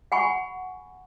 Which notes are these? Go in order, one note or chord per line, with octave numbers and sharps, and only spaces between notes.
F#5 G#5 B5 C#6